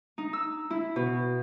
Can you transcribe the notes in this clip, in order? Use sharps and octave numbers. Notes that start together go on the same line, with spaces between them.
D#4
E6
E4
B2